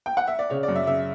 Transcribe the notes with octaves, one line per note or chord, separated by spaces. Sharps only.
G5
F#5
E5
D5
C#3 C#5
D5
F#2
E5
C#3 E5